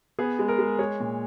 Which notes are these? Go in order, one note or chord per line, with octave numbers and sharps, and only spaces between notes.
B3 G#4
G#3
A#4
G#3
G#3 C#5
A#2